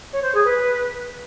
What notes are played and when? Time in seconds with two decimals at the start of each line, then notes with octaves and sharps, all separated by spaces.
0.11 C#5
0.22 C5
0.34 G#4
0.45 B4